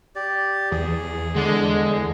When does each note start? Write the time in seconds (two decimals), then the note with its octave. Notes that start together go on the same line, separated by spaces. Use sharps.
0.16 G4 D5
0.72 E2 G#4
1.36 D3 G#3